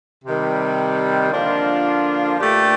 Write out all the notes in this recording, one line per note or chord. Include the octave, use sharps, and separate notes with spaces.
C3 D#3 G3
D3 F3 A#3 D4 F4
A#2 A3 D4 G4